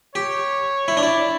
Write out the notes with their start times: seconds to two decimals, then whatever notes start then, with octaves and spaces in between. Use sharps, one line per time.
0.15 G4 C#5
0.88 E4
0.97 D4
1.03 E4 D5